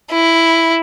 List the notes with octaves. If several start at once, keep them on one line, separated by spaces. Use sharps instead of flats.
E4